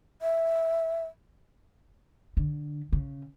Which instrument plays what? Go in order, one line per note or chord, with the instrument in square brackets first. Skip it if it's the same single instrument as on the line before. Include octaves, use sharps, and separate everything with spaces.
[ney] E5
[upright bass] D3
C#3